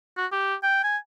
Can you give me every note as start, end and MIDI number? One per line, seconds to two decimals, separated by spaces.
0.17 0.26 66
0.32 0.55 67
0.63 0.81 79
0.83 0.97 80